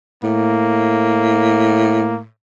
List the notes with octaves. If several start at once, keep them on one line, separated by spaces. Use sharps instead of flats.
A2 A#3